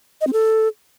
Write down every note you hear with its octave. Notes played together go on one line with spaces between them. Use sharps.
D#5
C4
A4